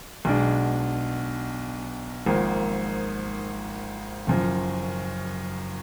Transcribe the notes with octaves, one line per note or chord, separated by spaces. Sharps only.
B1 B2 G#3 D4
G#1 G#2 F3 A#3
F#1 F#2 F3